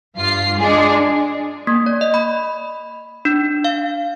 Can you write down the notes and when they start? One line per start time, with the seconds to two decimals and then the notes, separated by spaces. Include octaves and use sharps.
0.17 G2 F4 C7
0.58 G#3 D4 G#4
1.67 A#3
1.86 D5
2.01 D#5
2.14 B5
3.25 D4
3.64 F5